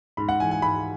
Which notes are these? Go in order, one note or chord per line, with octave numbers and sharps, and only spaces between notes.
G#2 B5
F#5
E3 G#5
G#5
G#2 B5